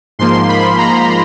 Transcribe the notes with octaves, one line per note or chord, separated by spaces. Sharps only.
G#2 F3 A#3 C6
B5
A#5